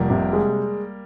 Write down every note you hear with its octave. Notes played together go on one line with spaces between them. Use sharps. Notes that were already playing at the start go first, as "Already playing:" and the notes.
Already playing: F1 G3 A#3
C3
G#3